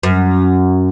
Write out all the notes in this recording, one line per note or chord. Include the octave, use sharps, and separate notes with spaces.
F#2